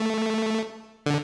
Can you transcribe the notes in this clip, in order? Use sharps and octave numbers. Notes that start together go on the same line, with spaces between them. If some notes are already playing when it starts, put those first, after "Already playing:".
Already playing: A3
D3